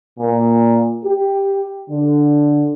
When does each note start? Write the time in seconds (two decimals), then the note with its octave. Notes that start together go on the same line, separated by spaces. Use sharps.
0.20 A#2
1.05 G4
1.89 D3